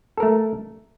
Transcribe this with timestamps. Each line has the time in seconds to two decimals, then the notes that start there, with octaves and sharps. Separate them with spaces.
0.17 A4
0.20 A#4
0.23 A3